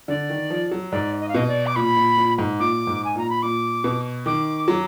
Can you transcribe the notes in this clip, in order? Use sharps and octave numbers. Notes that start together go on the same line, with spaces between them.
D3 D5
D#3
F3
F#3
G#2 D5
D#5
F5
B2 D#5
D5
D6
A#2 B5
A#2
A#2
G#2
A#2 D6
G#2
G#5
A#2 A#5
B5
A#2 D6
B2
D#3 D6
F#3